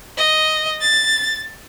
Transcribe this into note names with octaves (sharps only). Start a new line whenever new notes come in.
D#5
A6